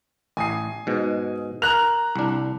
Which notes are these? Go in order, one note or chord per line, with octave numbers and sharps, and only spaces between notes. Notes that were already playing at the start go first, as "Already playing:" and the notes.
A1 G#5 D#6 C7
G#2 B2
A#4 A#5 F#6 F7
C2 D4